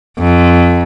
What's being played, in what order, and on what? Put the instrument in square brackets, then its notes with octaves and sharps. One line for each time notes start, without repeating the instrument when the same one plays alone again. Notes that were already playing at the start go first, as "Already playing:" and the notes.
[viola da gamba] F2